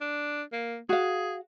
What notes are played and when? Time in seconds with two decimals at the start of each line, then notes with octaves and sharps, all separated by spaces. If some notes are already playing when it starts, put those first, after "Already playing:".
0.01 D4
0.53 A#3
0.89 F#4 G#4 F5